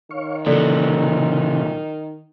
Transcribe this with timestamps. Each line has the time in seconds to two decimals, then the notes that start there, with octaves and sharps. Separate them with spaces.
0.11 D#3 C#5 F5 C#6
0.46 A#2 C#3 E3 F#3 A4 D5